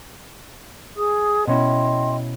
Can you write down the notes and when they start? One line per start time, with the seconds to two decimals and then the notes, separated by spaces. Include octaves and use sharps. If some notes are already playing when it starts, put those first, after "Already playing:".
0.96 G#4 D#6
1.47 B2 C#4 E4 D#5 G5 C6